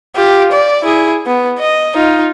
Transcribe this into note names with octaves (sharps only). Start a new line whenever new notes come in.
F4 G4
D5
E4 G#4
B3
D#5
D#4 F4